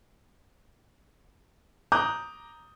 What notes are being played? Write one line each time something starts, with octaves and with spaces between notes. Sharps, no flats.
A#5 D6 D#6 F#6 G6